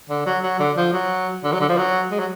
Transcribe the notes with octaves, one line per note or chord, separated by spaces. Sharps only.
D3
F#3
F#3
D3
F3
F#3
D3
F#3
D3
F3
F#3
G#3
F#3